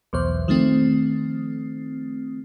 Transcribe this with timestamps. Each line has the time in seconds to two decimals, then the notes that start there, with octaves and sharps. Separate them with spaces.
0.13 B1 E2 C5
0.48 D#3 F3 A3 C4